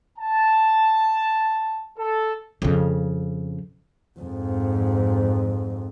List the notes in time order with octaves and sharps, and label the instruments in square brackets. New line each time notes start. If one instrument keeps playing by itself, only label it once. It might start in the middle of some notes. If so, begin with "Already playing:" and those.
[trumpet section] A5
A4
[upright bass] F2 C#3
[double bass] F2 G#2